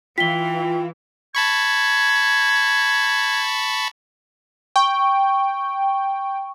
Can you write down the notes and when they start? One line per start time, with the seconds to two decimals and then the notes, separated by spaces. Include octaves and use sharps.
0.18 E3 F4 G5 B6 G7
1.35 A5 B5 C#6 G#6
4.76 G5 C#6